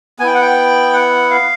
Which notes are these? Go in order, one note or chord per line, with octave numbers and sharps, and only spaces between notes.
B3 E4 G5 G#5
F#5
G5
F#5
F5